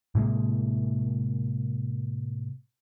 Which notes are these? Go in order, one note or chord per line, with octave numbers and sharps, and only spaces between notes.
A2 C3 G#3 A#3